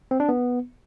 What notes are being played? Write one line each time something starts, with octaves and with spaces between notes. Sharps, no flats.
C4
D4
B3